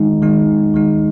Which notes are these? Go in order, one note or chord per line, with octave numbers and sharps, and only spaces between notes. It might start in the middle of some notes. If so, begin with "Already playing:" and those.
Already playing: D#3 G#3 D#4
D#3 G#3 D#4
D#3 G#3 D#4